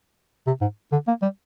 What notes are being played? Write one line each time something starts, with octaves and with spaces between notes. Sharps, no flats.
C3
G#2
D3
A#3
G3